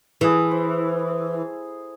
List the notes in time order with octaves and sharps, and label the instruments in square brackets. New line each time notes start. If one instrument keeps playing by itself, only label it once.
[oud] E3 [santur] G#4 A4
[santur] C5